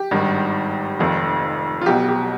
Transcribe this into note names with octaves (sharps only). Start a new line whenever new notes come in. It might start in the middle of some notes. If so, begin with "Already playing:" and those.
Already playing: G4
G#1 G2 D#3
F1 F2 D#3
F4
B1 B2 G4
G4